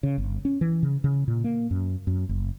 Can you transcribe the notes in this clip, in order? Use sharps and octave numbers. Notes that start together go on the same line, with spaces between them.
C#3
G1
C#4
E3
C#3
C#3
A#2
A#3
F#2
F#2
F#1